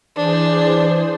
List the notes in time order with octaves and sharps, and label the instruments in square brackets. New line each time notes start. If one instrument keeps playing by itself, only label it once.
[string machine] E3 G#4 C5 [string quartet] D4